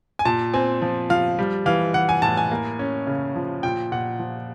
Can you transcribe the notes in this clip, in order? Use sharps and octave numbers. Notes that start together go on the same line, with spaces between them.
G#5
A#2 A5
C4 G#5
F3
F3 F5
G3
E3 F5
E3 F#5
G#5
A2 A5
G#5
A#3
C#4
C#3
F3
A#2 G5
A#2 F#5
F3